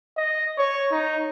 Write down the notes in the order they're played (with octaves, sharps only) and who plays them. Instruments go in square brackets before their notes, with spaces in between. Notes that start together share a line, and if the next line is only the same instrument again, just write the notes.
[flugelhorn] D#5
C#5
D#4